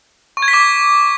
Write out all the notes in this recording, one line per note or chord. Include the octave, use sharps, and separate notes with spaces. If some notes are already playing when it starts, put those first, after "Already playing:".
C#6
G#6
B6
D6